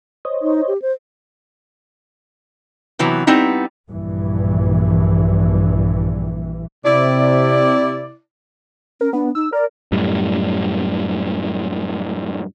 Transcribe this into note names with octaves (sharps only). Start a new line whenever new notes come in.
C5 C#5 D#5
D#4
G4
C5
C3 E3 F#3 B3
G3 B3 C4 D#4 E4
A#1 G2 E3
C3 E4 D5
C#4 A#4
B3 D4
D#4 E6
A#4 D5
F#2 A2 G3